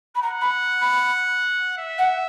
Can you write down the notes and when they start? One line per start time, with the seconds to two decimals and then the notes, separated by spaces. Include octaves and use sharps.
0.15 B5
0.21 F#5 A#5
0.41 B5
0.80 B5
1.78 E5
1.98 F#5